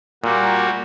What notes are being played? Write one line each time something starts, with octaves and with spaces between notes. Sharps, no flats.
A#2 G3 A#3 F#4